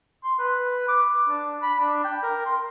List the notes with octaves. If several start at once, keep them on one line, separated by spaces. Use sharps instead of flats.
C6
B4
D6
D4
B5
D4
G5
A#4
C6